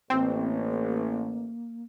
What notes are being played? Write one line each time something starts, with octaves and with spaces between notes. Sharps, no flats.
A1 A#3 C4